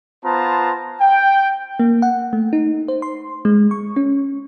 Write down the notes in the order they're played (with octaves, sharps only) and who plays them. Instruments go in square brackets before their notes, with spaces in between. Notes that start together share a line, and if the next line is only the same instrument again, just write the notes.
[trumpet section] B3 F4 C5 A5 A#5
G5
[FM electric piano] A#3
F#5
A3
D#4
C5
C6
G#3
C#6
C#4